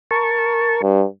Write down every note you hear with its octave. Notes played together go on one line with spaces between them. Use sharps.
A#4 A5 C#6
G2